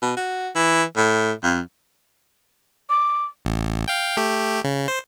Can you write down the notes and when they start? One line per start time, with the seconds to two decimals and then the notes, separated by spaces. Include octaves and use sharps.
0.02 B2
0.16 F#4
0.55 E3
0.96 A2
1.43 F2
2.90 D6
3.45 A1
3.88 F5 G5
4.17 A3 G4
4.64 C#3
4.88 C5